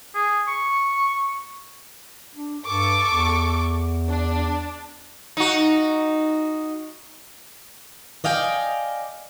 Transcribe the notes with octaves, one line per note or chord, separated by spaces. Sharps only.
G#4
C#6
D4
G2 A4 C#6 D6
E2
D4
D#4 F#4
D5 D#5 F5 G5 G#5